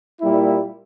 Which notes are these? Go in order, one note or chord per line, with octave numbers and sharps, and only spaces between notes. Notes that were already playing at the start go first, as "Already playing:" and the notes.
A#2 G3 A#3 E4